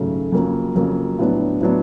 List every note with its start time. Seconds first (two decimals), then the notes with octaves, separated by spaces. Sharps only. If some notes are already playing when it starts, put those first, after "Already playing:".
Already playing: G#1 F#2 C#3 F#3 A3
0.32 F2 C#3 F#3 A#3
0.75 F2 C#3 F#3 A#3
1.19 A2 F#3 B3 D4
1.61 A2 F#3 B3 D4